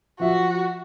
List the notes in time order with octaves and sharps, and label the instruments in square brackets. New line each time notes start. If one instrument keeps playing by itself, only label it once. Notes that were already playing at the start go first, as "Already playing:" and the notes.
[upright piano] F3 E5 [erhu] F#4